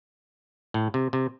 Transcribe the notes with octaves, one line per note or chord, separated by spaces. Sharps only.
A2
C3
C3